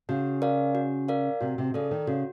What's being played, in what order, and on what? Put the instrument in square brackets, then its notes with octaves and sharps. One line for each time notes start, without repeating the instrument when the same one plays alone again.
[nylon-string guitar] C#3 [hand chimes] F#4
[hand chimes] A#4 D5 F5
F#4
A#4 D5 F5
[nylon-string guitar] C3 [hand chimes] F#4
[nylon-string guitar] C3
[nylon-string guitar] C#3 [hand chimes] A4 D5
[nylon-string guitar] D#3
[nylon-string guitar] C#3 [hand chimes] F#4